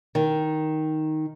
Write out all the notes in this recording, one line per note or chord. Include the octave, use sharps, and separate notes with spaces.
D#3